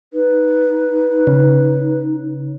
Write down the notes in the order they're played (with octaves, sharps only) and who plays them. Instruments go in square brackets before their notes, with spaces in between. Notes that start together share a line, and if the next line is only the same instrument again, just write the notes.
[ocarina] D#4 [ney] B4
[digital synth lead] C#3